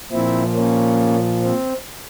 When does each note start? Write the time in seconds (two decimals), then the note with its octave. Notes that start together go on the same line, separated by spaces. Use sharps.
0.12 A#2 F3 C4 E4
0.55 A#3 C#4
1.43 C4